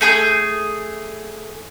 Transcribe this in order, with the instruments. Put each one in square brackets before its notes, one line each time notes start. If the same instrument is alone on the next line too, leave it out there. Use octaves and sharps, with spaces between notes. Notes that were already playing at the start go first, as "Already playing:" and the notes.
[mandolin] A3 G#4 A#5 G6